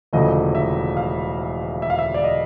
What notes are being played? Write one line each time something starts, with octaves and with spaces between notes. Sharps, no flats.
E1 D2 C#3 F3 A3 D#5
E5
F5
E5
F5
E5
D5
D#5